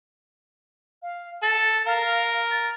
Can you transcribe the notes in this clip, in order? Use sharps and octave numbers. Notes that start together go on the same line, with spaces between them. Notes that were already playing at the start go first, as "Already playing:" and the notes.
F5
A4 A6
A#4 F5
A6